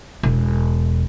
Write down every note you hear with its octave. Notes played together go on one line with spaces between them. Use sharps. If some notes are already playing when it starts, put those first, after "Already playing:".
E1